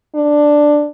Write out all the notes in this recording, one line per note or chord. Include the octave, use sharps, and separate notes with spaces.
D4